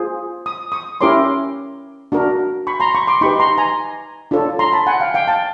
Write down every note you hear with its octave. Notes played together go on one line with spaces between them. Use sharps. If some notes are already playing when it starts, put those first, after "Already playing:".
Already playing: F4 G#4 C5
D#6
C#6 D#6
C#4 E4 G4 A#4 C#5 C6 D6
D4 F#4 A#4
B5 C#6
A#5 C6
B5 C#6
C6 D6
D#4 G4 B4 B5 C#6
A#5 C6
G#5 A#5
D4 F4 A4 C#5
A#5 C6
A5 B5
F#5 G#5
F5 G5
F5 G5
G5 A5